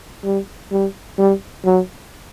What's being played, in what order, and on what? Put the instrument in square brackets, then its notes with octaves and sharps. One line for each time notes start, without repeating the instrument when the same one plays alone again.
[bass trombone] G3
G3
G3
F#3